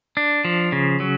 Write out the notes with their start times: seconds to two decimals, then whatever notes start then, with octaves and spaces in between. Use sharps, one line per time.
0.17 D4
0.45 F3
0.72 C#3
1.00 F#3